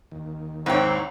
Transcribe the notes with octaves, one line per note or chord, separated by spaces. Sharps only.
D#2
C2 G#2 C4 E4 C#5 G5